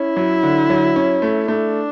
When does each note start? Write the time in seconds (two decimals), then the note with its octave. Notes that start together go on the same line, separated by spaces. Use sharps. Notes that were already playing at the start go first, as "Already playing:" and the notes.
Already playing: C#4 E4
0.16 F#3
0.43 D3
0.70 F#3
0.96 C#4
1.22 A3
1.48 A3 D4